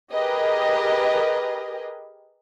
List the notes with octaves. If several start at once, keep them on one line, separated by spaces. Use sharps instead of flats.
G4 G#4 A#4 B4 D#5